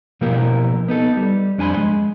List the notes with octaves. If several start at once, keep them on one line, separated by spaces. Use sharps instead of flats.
B2 F3 A#3 E4 G4 A#4
B3 D#4 A4
G3
F2 D4 G#5 A5 B5 C6
G#3